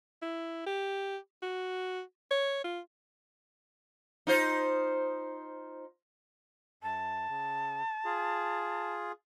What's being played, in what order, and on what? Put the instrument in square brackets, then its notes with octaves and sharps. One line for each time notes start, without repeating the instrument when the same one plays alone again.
[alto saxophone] E4
G4
F#4
C#5
F4
[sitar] D#4 F4 C5
[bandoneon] F#2 [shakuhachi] A5
[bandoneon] C#3
F4 G#4